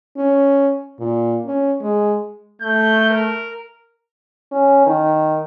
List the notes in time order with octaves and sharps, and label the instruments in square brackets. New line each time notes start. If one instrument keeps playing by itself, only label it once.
[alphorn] C#4
A#2
C#4
G#3
[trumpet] A3 [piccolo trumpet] G6
[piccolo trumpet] A#4
[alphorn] C#4
D#3